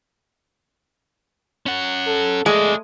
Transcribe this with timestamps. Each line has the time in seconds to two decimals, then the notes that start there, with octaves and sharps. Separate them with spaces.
1.66 C#4 F#5
2.07 A4
2.46 G#3 A3 G#4 D5